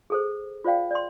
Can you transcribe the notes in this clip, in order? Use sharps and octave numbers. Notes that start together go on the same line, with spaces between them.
G#4 A4 C5
F4 C5 D5 F5 G5
D5 C6